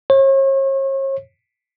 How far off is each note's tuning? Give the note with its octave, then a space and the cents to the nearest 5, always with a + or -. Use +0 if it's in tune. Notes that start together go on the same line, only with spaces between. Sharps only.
C#5 -40